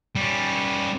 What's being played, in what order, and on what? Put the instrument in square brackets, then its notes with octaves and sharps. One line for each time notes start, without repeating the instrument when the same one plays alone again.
[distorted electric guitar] G3 C#4